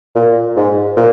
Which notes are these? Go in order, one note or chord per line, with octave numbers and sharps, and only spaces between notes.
A#2
G#2
A#2